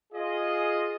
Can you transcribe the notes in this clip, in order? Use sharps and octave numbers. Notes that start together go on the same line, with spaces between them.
F4 G#4 D#5